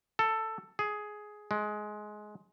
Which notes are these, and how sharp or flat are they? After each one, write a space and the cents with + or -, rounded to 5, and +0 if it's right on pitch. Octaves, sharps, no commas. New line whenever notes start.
A4 +10
G#4 +10
G#3 +15